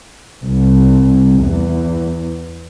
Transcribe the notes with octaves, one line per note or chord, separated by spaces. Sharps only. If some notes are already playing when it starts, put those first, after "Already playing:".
C2
E2